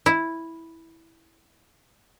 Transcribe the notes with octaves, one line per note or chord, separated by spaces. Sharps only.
E4